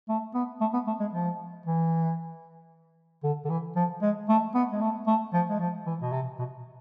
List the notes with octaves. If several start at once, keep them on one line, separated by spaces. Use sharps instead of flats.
A3
B3
A3
B3
A3
G#3
F3
E3
D3
D3
E3
F3
G#3
A3
B3
G#3
A3
A3
F3
G#3
F3
E3
B2
C3
B2